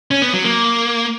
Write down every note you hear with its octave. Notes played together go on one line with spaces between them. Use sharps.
C#4
B3
F#3
A#3